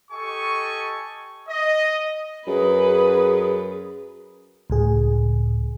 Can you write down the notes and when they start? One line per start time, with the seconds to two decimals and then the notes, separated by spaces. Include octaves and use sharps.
0.12 G4 A4 D#5 G#5 C#6
1.49 D#5
2.47 F#2 G#4 B4
4.70 C#2 A2 G#4